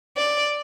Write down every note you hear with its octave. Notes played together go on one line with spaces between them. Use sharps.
D5